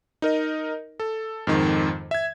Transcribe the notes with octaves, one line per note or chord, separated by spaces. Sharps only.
D#4 A#4 D#5
A4
F2 G#2 D#3
E5 G#6